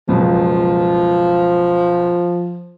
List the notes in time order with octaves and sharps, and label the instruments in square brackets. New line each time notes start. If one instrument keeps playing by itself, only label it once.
[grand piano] C#2 F#2 B2 [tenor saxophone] F3